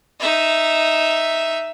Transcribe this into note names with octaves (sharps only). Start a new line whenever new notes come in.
D#4 E5